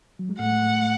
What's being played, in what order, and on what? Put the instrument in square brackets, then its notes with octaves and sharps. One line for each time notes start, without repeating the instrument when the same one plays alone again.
[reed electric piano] F#3
G#3
[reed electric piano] A2 A3 [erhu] F#5